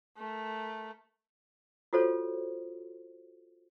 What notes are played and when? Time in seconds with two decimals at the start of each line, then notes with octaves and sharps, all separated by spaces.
0.17 A3 A#4
1.93 F4 F#4 A4 C5 C#5